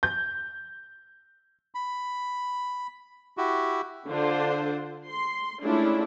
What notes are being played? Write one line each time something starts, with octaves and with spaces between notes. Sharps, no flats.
G6
B5
E4 F#4 G4
D3 D4 F4 C5
C6
G#3 A3 C#4 D4 E4 F4